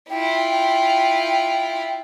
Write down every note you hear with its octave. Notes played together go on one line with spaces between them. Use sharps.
E4 F4 G5